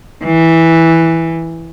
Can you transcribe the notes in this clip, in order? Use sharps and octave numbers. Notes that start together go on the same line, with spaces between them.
E3